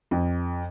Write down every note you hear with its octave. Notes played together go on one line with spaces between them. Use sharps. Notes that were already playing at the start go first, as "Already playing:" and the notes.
F2